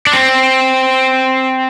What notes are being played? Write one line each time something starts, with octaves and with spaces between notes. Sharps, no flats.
D4
C4